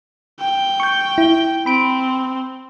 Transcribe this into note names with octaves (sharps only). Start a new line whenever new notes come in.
G5
C#6 G6
E4
C4 B5 D7